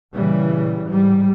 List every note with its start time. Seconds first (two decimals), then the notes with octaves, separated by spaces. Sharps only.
0.13 A#2 C#3 E3 G3
0.85 G#2 G3